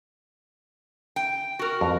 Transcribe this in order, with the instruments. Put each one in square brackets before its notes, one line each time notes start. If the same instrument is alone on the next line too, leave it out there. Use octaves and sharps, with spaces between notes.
[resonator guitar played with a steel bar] G5
F#4 A#4
[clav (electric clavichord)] F2